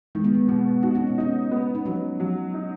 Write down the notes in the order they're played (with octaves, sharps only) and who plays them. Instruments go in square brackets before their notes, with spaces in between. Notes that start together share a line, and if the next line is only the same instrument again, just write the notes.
[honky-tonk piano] D#3 [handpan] G#3
[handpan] B3
G#3
[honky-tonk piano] B2 [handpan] B3
[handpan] D#4 [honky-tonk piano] F#4
[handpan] C#4
B3
[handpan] C#4 [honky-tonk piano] D#4
[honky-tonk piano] B3
[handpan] D#4
[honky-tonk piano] F#3 [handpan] C#4
[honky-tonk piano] F#3
D#4